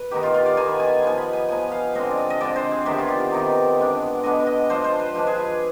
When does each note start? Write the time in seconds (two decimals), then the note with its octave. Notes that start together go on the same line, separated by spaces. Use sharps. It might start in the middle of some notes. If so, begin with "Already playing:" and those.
Already playing: B4
0.11 D#3 B3 D#4 G4
0.23 F4
0.34 F4
0.46 D5
0.57 D#3 B3 D#4 G#5
0.69 B5
0.80 G#5
1.02 F3 B3 D#4 G#5
1.18 B5
1.33 G#5
1.48 F3 B3 D#4 G#5
1.72 F5
1.95 D3 G#3 C4 D#5
2.11 D5
2.17 D#5
2.30 D#5
2.40 D3 G#3 C4 D5
2.56 C5
2.71 G#4
2.86 C3 D#3 B3 D#4 G4
2.98 F4
3.08 D5
3.20 D5
3.31 C3 D#3 B3 D#4
3.78 D3 G#3 B3 D4
4.23 D3 G#3 B3 D4 D#5
4.47 D#5
4.70 F3 G#3 D4 C5
4.84 C5
5.00 B4
5.15 F3 G#3 D4 C5
5.27 G#4
5.38 B4